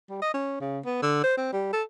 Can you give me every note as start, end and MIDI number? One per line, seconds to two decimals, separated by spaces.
0.10 0.21 55
0.22 0.31 75
0.34 0.58 61
0.61 0.79 49
0.86 1.01 59
1.02 1.19 50
1.24 1.37 72
1.37 1.51 60
1.53 1.69 55
1.73 1.83 69